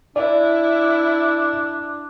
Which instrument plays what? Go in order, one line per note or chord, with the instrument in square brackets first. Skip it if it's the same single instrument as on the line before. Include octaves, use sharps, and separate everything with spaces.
[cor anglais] D4 [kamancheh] E4 [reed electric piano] D5